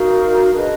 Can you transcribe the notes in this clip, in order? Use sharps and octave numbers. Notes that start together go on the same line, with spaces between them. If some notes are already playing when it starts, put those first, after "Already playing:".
Already playing: D#4 F#4 A#4 F5
D4 G#4 B4 D#5